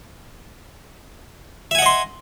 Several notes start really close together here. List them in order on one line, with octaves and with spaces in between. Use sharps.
E5 G#5 F#5 D#5 C6